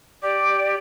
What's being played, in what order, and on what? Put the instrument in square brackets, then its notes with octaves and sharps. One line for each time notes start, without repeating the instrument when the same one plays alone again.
[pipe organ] G4 [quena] D5